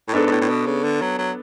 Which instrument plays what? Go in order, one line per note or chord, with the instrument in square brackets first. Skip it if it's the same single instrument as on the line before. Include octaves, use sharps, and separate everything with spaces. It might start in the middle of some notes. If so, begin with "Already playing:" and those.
[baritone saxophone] A2
[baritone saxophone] G#2 [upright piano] B3 D4 A4
[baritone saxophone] G#2
A2
A2
B2
C#3
D3
F#3
F#3